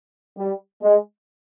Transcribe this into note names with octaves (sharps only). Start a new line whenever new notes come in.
G3
G#3